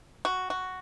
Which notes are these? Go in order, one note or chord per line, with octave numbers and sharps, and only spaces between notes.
F#4
F#4